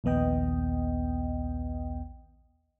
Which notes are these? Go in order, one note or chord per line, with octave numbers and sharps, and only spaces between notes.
A#1 D#2 B3 D#5 G5